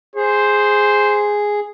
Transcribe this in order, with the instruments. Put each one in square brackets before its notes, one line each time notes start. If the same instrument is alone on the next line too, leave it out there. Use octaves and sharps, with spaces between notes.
[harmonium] G#4 [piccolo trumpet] C5